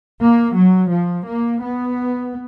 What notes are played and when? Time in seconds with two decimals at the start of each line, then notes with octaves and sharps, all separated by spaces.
0.21 A#3
0.56 F#3
0.91 F3
1.27 A#3
1.62 B3